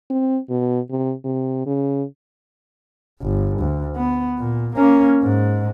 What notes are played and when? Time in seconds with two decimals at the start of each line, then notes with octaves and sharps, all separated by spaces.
0.10 C4
0.50 B2
0.90 C3
1.25 C3
1.66 C#3
3.21 G1
3.60 D2
3.96 B3
4.39 A#2
4.76 A#3 C#4
5.23 G#2